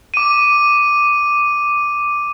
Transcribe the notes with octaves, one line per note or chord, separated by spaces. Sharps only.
D6 D#7